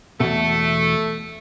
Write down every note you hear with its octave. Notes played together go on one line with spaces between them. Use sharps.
E2 B2 A3